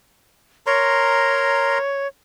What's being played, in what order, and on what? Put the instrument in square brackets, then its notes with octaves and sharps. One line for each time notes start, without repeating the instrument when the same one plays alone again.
[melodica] A#4 A#5 C6 [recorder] C#5